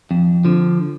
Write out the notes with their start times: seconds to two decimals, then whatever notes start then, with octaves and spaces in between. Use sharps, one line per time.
0.11 F2
0.45 D3 F3